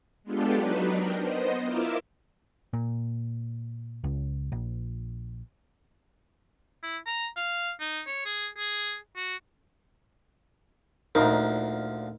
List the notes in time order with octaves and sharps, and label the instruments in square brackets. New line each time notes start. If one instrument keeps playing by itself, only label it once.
[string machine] G#3 B3 D4 F4 G4 A4
F#3 D4 D#4 B4
D4 A#4 G5
B3 C5 D#5
E4 F4 A#4 D6 E6
[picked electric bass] A#2
C#2
A#1
[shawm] E4
A#5
F5
D#4
C#5
G#4
G#4
F#4
[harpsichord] D2 A#2 F3 [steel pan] D#4 A#4